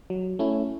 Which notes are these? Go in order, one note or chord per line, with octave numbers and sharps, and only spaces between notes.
F#3
A3 C#4 E4